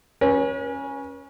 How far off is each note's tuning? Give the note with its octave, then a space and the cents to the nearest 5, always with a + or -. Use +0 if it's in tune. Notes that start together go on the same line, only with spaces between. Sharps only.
C#4 +0 B4 -45